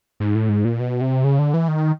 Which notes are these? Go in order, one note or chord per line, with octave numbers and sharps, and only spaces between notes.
G#2
A2
G#2
A#2
B2
C3
C#3
D3
E3
D#3